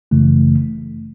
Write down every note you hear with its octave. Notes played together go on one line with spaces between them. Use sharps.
G1 F#2 C#3 E3 A3